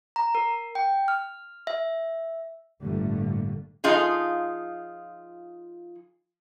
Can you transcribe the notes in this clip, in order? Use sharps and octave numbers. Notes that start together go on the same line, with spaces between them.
A#5
A#4
G5
F6
E5
G1 A2 D3 G3 A3 A#3
F3 D#4 F4 G#4